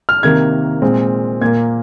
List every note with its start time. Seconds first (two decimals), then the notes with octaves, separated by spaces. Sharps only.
0.09 F6
0.23 C3 D#3 A#3 G#6
0.82 A#2 G#3 C4
1.41 A#2 A#3 G#6